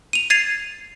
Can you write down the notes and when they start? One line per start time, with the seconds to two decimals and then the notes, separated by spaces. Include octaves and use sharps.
0.13 D#7 F7
0.30 G#6 A6 C7 D#7 F7